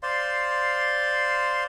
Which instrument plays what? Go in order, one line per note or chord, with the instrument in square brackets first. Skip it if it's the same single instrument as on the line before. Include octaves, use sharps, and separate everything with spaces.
[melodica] C5 D5 F5 C6